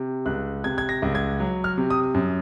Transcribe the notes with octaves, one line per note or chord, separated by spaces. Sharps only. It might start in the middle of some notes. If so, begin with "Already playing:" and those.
Already playing: C3
C#2 F#6
C3 G#6
G#6
A#6
C#2
G#6
F#3
F6
C3
D#6
F#2